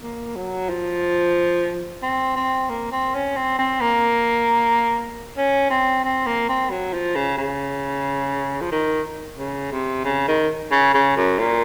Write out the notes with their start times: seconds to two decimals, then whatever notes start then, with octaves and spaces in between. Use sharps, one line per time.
0.02 A#3
0.36 F#3
0.69 F3
2.02 C4
2.36 C4
2.69 A#3
2.92 C4
3.14 C#4
3.36 C4
3.59 C4
3.81 A#3
5.37 C#4
5.70 C4
6.04 C4
6.26 A#3
6.49 C4
6.70 F#3
6.93 F3
7.15 C#3
7.38 C#3
8.61 F3
8.71 D#3
9.38 C#3
9.72 C3
10.05 C#3
10.28 D#3
10.72 C#3
10.94 C#3
11.16 F#2
11.39 A#2